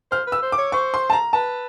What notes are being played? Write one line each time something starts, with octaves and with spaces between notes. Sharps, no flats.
C5 F6
B4
E6
C5
D6
C#5
C5 C#6
C6
A5
A#5
B4 A5